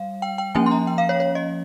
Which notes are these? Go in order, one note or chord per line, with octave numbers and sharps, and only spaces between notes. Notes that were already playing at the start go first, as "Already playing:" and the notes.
Already playing: G3 F5
G5
G5
F3 A#3 C#4 G#5
C6
A#5
G5
F5
C#5
C#5
D#5